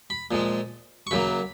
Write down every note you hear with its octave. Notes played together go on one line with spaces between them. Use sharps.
B5
A#2 F3 G#3
C#6
F#2 C#3 F#3 A#3 B5